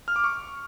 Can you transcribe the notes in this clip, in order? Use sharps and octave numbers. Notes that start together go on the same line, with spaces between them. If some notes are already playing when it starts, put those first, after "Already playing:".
F6
D6
C#6